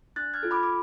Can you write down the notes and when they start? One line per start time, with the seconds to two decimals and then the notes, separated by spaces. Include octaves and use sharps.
0.16 D4 F#6 A6
0.34 F6 G#6
0.43 F4 A4
0.51 B5 D6
0.63 D6